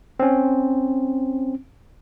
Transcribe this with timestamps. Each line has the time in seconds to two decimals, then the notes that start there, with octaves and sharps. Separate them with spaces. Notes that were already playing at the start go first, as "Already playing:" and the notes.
0.20 C4 C#4